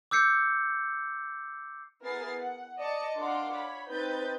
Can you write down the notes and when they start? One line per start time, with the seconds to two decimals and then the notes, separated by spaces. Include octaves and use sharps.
0.11 D6 E6 G6 C7 C#7
2.02 B3 E4 G#4 A#4 A6 C7
2.40 F#5
2.79 D5 D#5 A5 C#7
3.18 D4 F4 A#4 F#5 C6 D6
3.53 C#5 B5
3.87 C4 D#4 B4 G6 A6